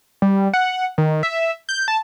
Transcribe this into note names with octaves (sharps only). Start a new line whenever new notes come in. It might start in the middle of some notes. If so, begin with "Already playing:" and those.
G3
F#5
D#3
E5
G6
A5